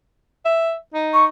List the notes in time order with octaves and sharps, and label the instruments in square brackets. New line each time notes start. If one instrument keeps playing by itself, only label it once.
[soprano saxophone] E5
D#4
[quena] C#6